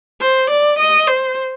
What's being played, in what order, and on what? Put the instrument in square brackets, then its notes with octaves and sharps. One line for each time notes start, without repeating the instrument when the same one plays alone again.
[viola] C5
D5
D#5
C5